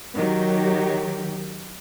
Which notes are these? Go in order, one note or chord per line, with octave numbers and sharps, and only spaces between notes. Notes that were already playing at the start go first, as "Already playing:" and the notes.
D#3 F#3 G4